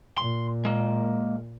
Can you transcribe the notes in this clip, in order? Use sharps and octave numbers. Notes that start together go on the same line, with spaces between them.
A#2 C6
G#3 A#3